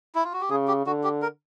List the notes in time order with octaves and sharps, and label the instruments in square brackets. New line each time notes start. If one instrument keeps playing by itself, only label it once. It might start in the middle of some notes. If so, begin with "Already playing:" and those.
[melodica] E4
F4
F#4
G4
[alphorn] C#3 [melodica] G#4
[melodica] G4
[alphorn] D3 [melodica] F#4
[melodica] G4
A#4